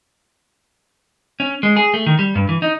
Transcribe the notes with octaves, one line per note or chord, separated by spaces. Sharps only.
C#4
G#3
G#4
A3
D#3
G3
G2
E3
D#4